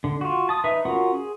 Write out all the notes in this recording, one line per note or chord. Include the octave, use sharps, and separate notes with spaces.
D3
F4 F#4
A5 D#6
D#4 B4 E5
C#4 F4 F#4 A#4 F#5
G#4